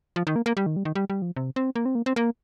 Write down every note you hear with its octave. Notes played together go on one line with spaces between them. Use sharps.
F3
D#3
A#3
A#3
G3
D#3
G3
D#3
G3
G3
F3
C3
C4
A#3
C4
A#3
C4
A#3